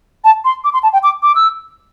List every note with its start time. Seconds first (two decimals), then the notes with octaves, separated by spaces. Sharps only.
0.24 A5
0.45 C6
0.64 D6
0.73 C6
0.83 A5
0.93 G5
1.03 D6
1.23 D6
1.35 E6